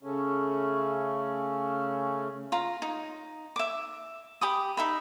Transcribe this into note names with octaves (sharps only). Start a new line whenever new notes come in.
C#3 A3 C#4
F4 A#5
D#4
E5 D6
G4 B5 D6 D#6
D#4 E5 B5